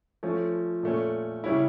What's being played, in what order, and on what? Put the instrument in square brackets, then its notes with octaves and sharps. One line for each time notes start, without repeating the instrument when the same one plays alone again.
[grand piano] F3 A3 C#4
A#2 A3 C#4
C#3 G3 C#4 E4